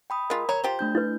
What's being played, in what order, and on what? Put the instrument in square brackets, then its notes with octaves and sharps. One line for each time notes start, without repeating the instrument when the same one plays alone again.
[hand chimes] G5 B5 D#6
[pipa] G#3 F4 [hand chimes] A#4
[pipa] C#5 [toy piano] A#5
[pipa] F4 G4 C5
[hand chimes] A3 D4 G6
[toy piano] E4 B4